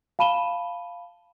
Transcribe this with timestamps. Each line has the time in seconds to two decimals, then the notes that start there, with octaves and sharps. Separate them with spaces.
0.19 F5 A5 B5 D#7 E7 G7